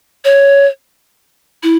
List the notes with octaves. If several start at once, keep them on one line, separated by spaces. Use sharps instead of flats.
C#5
E4